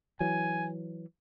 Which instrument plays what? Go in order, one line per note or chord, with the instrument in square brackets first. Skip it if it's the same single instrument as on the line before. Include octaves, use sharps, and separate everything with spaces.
[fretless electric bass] E3 F#3 [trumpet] G#5